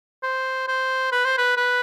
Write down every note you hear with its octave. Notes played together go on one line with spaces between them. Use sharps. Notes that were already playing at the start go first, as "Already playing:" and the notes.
C5
C5
B4
C5
B4
B4